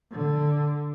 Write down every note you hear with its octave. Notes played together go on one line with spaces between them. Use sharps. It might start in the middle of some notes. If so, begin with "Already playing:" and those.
D3